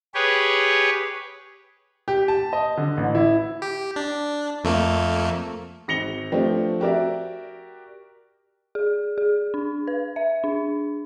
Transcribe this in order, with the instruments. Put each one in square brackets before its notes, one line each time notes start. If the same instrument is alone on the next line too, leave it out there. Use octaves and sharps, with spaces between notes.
[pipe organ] G4 G#4 B4 C#5
[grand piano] G4
A5
D#5
D3
A1
E4
[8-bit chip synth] G4
D4
F2 A3 A#3
[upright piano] G#1 A#6 C#7 F7 G7
F3 A3 C4 D4 G4
F#4 G4 A#4 D5 E5
[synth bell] G#4
G#4
D4
B4
E5
D4